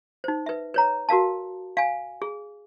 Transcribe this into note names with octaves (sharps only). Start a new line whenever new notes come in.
D#4 C5
B4 E5
B4 C#5 A#5
F#4 A#4 F5 A5
F5 G#5
G#4